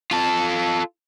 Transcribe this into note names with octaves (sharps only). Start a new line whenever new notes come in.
F4 A4